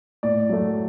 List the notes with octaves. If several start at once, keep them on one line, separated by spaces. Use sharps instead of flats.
A2 D5
F#3 A3